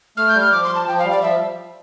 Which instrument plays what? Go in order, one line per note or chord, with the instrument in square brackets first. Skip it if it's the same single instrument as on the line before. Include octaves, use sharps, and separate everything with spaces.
[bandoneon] A3 [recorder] F6
[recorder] G6
[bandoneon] G3
[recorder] F6
[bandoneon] F3 [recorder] D6
[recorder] C6
A5
[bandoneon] F3 [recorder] G5
[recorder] F5
[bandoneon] G3
[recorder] D5
[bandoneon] F3 [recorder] E5